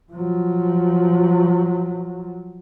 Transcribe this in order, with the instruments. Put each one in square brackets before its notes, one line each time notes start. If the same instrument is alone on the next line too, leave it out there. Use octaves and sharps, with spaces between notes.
[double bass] F3 F#3